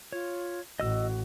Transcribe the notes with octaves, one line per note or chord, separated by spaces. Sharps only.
F4 C#5
A1 F#4 D#5 E6